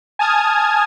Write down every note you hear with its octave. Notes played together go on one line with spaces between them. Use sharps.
G#5 A5 D#6 F6 G#6